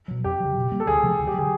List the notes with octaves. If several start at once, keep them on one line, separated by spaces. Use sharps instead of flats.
B2 F#3
F2 G4
C#3 F#3
B2
G3 A#3
A4
D2 G#4
C3 F3 A3
D2
G4
D3 F#3 G#4